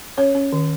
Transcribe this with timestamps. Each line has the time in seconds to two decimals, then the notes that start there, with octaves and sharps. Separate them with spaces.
0.18 C#4 C#5
0.35 C#4
0.53 D#3